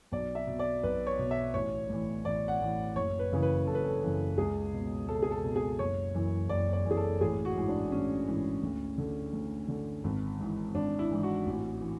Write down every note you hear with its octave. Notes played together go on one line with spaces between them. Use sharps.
B1 D5
E5
B2
D5
B1 B4
C#5
B2
E5
A1 C#5
A2 E3
A1 D5
F#5
A2 E3
F#1 C#5
B4
F#2 C#3 E3
B4
F#1 A4
B4
A4
F#2 C#3 E3
C#2 G#4
B2
C#2 A4
G#4
A4
B2
G#4
F#1 C#5
F#2 E3
F#1 D5
D5
F#2 E3
G#4
A4
A1 G#4
F#4
G#2 E3
D4
A1 C#4
G#2 E3
D2
D3
D2
D3
G#1
G#2 E3
G#1 D4
E4
G#2 E3
F#4
A1
E3